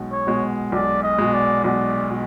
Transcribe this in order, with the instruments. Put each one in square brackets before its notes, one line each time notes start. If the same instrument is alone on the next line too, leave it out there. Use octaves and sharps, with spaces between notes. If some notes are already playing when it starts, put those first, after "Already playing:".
Already playing: [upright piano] B1 B2 G#3
[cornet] C#5
[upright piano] B2 G#3
[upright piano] B1 [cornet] D5
[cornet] D#5
[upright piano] B2 G#3
[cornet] D5
[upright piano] B1 [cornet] D5
[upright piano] B2